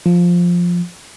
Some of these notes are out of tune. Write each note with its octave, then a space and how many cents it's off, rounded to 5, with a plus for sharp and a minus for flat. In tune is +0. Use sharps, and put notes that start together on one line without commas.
F3 +5